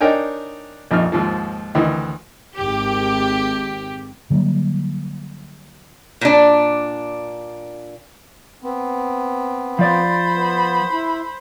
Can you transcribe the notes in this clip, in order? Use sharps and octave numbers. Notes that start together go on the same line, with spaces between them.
D4 D#4 A#4 C#5 G5 G#5
A#1 F2 D#4 F6
D#2 G#2 F3
D2 D#3 E3
G#1 G4
D3 F#3 G3 A#3
A#2 D4
B3 C4
F3 C5 D5 B5
B3
E4